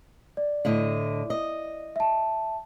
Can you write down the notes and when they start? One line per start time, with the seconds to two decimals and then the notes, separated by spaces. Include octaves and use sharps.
0.37 D5
0.65 A2 D3 D#5
1.30 D#5
1.96 E5 A5